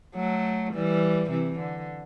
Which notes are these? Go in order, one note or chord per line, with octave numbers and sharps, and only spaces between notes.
F#3 A3
E3 G3
C3 E3
D3